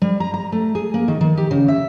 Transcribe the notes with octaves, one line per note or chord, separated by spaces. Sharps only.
G3
A#5
A#5
A3
G#4
A#3
D#3
D#3
G4
C#3
E5